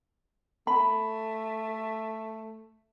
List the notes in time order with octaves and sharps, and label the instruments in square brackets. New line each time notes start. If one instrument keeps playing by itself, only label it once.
[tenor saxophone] A3 [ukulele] B5